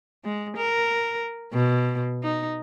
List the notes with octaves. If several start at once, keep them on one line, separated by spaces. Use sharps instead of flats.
G#3
A#4
B2
D#4